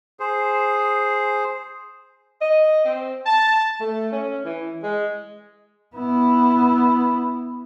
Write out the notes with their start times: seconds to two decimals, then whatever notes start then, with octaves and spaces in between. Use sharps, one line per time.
0.20 G#4 C5
2.42 D#5
2.84 C4
3.26 A5
3.80 A3
4.12 C#4
4.45 E3
4.83 G#3
5.96 B3 E4